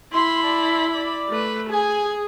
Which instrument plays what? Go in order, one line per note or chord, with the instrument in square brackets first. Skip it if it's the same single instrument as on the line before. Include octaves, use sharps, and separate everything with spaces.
[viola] E4 B5 [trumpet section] C6
[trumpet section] D5 A5 C6
D5
[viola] A3 B4
[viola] G#4 [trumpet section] G#5